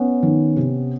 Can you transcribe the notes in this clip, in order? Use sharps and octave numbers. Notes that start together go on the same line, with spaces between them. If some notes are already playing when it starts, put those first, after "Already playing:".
Already playing: B3 C#4
D#3
C3